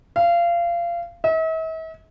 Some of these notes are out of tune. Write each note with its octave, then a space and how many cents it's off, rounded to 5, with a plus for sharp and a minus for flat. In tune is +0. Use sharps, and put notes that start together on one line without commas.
F5 -25
E5 -45